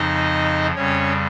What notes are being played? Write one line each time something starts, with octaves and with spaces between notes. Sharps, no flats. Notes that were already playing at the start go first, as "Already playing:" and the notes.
Already playing: F2 C#3 F3 D#4 D#5
F2 C#3 G3 C#4 C#5